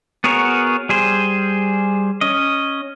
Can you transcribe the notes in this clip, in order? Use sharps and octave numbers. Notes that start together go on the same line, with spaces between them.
B3 F#4 G#4 A#4 C#5
G3 G#4 C5
C#4 D#5